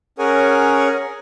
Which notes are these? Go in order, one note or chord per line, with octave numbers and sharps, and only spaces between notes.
C#4 G#4 A#4 C#5 F#5 G#5